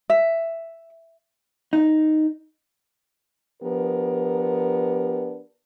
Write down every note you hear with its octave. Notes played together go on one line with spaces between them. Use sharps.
E5
D#4
F3 B3 D4 G4 A#4